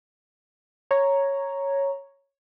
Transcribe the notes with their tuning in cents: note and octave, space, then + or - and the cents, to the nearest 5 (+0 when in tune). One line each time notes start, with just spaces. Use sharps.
C#5 -5 A#5 +0